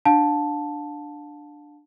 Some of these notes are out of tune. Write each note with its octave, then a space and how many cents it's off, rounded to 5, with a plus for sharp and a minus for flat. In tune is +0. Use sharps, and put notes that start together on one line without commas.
D4 +10 F5 +35 A5 +0